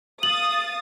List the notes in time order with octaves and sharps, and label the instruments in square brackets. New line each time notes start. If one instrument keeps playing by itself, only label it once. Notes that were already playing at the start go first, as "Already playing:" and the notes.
[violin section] F5 D#6 A6 [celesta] F#7